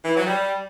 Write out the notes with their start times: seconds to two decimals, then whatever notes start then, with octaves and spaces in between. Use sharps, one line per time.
0.05 E3
0.15 F#3
0.26 G3